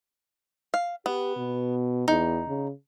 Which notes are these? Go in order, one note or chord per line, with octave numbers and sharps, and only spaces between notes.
F5
B3 G4
B2
E2 D#4
C#3